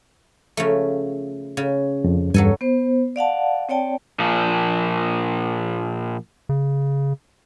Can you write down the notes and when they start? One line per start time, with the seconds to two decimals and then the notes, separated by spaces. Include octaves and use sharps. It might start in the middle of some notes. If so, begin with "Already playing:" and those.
0.57 C#3 F3 A3
1.57 C#3
2.04 F2
2.34 E2 G2 F#3 A4 G#5
2.61 B3 C5
3.16 D5 F5 F#5 A5
3.69 C4 C#5 D5 G5 A5
4.19 A#2 F3
6.49 C#3